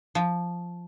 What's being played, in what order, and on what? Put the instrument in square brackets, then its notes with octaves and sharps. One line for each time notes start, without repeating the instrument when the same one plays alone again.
[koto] F3